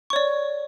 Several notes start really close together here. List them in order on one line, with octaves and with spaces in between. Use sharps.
C#6 C#5 D5